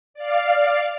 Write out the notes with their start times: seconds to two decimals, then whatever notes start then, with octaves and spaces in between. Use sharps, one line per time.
0.14 D5 F5